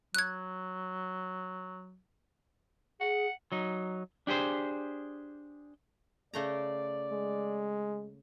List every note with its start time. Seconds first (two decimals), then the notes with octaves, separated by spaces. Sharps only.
0.15 F#3 F#6 G#6
3.01 G#4 F#5
3.52 F#3 D#4
4.27 D4 G4 G#4 C5
6.34 C#3 A3 D5 A#5
7.12 G#3